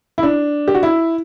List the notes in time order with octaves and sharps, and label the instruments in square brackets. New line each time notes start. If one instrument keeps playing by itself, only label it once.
[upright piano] E4
D4
G4
F#4
E4